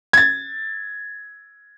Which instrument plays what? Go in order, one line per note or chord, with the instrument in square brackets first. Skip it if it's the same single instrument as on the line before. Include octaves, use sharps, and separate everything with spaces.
[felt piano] G#6 A6